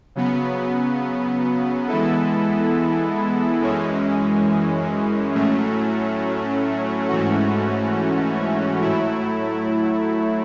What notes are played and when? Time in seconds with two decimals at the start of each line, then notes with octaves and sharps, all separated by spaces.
0.15 C#3 F#3 B3
1.88 E3 G#3 B3 E4 A4
3.61 F#2 E3 G#3 C#4
5.35 A2 F#3 A3 C#4
7.08 G#2 E3 A3 C#4 F#4
8.81 A2 F#3 A3 E4